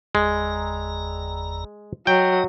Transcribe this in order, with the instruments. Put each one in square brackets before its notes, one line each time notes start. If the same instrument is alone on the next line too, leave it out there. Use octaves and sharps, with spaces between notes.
[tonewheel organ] G1 E2 A#5 [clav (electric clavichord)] G#3
[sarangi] F#3 [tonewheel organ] D#5 [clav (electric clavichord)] G5